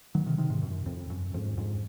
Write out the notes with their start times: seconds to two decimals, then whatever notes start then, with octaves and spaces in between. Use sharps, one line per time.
0.15 D#3 F#3
0.26 C3 D#3
0.38 C3 D#3
0.50 G#2 C3
0.62 F#2
0.86 F2
1.10 F#2
1.34 F2 G#2
1.57 F2 G#2